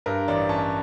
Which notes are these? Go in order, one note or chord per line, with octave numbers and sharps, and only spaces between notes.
G2 A#4
A1 D5
C#4 A5